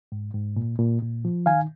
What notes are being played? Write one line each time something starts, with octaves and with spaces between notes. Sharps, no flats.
G#2
G#2
A#2
A#2
A#2
F3
D#3 F5 G#5